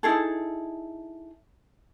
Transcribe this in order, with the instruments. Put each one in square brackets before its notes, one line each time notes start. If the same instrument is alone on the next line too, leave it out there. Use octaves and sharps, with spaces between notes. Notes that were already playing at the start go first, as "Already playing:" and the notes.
[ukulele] D#4 E4 G#4 A4